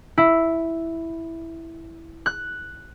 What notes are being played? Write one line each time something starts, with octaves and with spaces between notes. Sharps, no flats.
E4
F#6